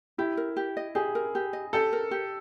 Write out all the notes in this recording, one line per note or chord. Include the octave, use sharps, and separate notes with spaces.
E4 G4
A#4
G4
D#5
G4 G#4
A#4
G4
D#5
G4 A4
A#4
G4